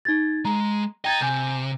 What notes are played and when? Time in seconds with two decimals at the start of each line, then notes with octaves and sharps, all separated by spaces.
0.05 D#4 G#6 A6
0.45 G#3 A#5
1.05 D#5 G5 A#5 G#6 A6
1.21 C3 G#5 G6